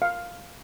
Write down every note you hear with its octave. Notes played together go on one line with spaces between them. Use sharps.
F5